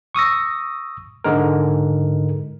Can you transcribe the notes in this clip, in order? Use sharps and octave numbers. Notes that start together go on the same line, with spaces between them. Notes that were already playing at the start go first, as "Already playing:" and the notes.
C#6 D#6 E6 A#6
G#2 D3 G#3 A#4